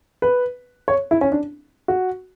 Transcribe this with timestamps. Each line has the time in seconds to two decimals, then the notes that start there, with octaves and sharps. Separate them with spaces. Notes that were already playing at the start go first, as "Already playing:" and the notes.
0.22 B4
0.88 C#5
1.11 E4
1.21 C#4
1.32 D4
1.88 F#4